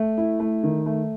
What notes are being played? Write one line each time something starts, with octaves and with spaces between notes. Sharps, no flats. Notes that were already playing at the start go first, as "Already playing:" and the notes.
Already playing: A3
E4
A3
D#3
A3